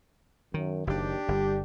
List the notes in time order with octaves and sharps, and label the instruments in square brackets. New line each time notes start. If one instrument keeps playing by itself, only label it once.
[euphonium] F#2 [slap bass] D#3
[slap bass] F#1 [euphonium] D#2 [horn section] D4 G4
[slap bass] G1 [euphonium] G3